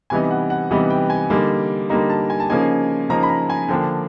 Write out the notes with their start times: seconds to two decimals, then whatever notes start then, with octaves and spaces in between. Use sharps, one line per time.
0.10 C3 E3 G3 B3 D#4 G#5
0.31 F#5
0.50 F#5
0.71 C3 E3 G3 B3 D#4
0.90 G5
1.10 G#5
1.30 D3 G3 A#3 D#4
1.89 D3 G3 A#3 D#4 A#5
2.10 A5
2.30 G#5
2.40 A5
2.50 C#3 F3 A#3 D#4 G#5
3.10 C#3 F3 A#3 D#4 A#5
3.23 B5
3.29 A#5
3.50 G#5
3.69 D3 F3 A#3 D4 G5